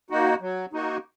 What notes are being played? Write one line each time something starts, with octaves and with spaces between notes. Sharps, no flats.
A#3 D#4 F#4
F#3
A#3 D#4 F#4